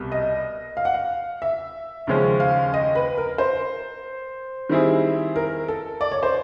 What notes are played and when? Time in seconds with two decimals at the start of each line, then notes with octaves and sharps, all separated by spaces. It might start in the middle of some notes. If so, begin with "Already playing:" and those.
Already playing: C2 B2 G3
0.12 D#5
0.77 F5
0.85 F#5
0.94 F5
1.42 E5
2.07 D#2 C#3 F3 G#3 C#4
2.40 F5
2.74 D#5
2.95 B4
3.18 A#4
3.38 C5
4.69 D#3 G3 C4 E4 G#4
5.36 A#4
5.68 A4
6.01 D5
6.12 C#5
6.23 C5